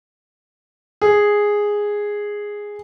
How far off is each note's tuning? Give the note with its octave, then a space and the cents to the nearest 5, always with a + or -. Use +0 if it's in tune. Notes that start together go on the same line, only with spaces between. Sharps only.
G#4 -5